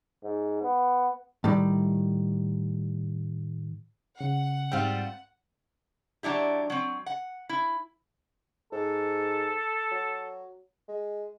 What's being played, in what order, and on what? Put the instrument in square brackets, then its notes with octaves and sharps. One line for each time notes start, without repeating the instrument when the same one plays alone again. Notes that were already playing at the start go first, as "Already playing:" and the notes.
[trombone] G#2
B3
[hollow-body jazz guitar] A2 D#3 G3
[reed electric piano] C#3 [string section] F#5
[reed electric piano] G#2 G5 [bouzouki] G3 C4 F4
[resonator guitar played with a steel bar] F#3 D4 E4 G4
F#3 C4
F#5
E4
[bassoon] G#2 [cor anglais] A4
[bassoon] F#3
G#3